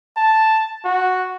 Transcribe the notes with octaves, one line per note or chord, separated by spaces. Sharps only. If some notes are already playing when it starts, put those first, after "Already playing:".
A5
F#4